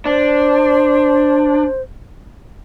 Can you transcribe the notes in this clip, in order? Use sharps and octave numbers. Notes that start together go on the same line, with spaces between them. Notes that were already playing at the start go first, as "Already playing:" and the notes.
D4 C5